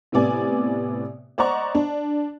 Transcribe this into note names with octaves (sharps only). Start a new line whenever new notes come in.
A2 C3 B3 D5 G#5
C5 D5 D#5 F#5 A#5 C#6
D4